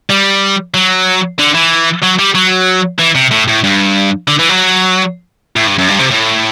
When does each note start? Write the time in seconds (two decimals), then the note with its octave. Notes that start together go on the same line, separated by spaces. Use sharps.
0.10 G3
0.74 F#3
1.39 D3
1.54 E3
2.02 F#3
2.19 G3
2.35 F#3
2.99 E3
3.15 C3
3.31 A2
3.48 A2
3.64 G2
4.28 D3
4.39 E3
4.49 F#3
5.56 A2
5.67 G2
5.78 F#2
5.89 G2
5.99 C3
6.11 A2